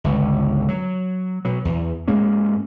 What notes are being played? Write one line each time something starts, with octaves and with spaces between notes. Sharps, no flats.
G1 C#2
F#3
B2 F#3
E2
G#2 G#3 A#3 C#4